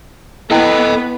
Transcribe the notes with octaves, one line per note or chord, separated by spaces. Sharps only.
B3 E4 A4 B4 D#5 G5